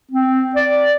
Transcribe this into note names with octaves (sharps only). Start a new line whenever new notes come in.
C4
D5